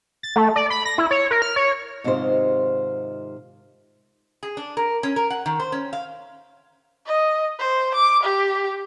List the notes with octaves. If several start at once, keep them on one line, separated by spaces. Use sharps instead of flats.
A6
A3
D5
B5
A#6
E4
C#5
A#4
F6
C#5
G#2 C3 D#3 F4 C5
G#4
D4
A#4
C#4
A#4
F#5
D#3
C5
C#4
F5
D#5
C5
D6
G4